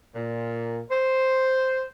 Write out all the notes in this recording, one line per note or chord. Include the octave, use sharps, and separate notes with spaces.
A#2
C5